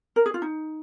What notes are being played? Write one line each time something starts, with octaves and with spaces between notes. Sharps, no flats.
A#4
G#4
F4
D#4